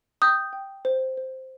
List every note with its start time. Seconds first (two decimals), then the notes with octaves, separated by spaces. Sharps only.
0.22 G5 D#6 G6
0.53 G5
0.85 C5
1.17 C5